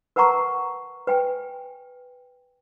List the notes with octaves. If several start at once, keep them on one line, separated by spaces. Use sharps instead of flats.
A#4 B4 F#5 A5 A#5 C#6
B4 G5 G#5